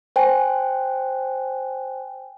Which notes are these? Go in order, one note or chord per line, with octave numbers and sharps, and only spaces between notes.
C5 G5 G#5